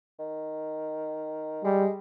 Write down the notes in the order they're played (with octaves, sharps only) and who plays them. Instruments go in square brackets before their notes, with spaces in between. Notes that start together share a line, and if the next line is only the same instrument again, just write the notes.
[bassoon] D#3
[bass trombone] G3 [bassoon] G#3